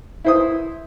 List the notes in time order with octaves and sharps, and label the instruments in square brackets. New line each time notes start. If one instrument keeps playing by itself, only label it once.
[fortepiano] E4 C5 D#6